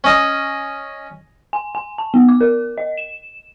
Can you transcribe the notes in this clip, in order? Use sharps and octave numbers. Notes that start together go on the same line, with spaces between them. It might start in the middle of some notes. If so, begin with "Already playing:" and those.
C#4 D#5
G#5
G#5
A5
B3
D6
A#4
D#5
E7